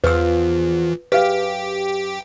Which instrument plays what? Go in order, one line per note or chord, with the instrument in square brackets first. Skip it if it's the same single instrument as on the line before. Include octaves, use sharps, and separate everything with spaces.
[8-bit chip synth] E2 [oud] F3 F4 C5 [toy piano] B4 E6
[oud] F#2 G#4 [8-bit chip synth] G4 [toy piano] B4 F5